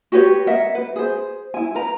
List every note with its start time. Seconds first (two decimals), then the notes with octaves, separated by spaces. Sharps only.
0.12 F#4 G4 B4 C#5
0.47 A#4 D#5 E5 F#5
0.75 B4
0.96 G#4 C5
1.54 E4 G#5
1.75 A#4 B4 A#5